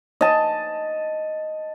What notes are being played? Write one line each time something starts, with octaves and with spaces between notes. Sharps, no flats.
D#5 A5